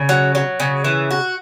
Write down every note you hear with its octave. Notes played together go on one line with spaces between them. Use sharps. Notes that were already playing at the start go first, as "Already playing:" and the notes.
Already playing: C#3
F#3
F#3
C#3
E3
F#4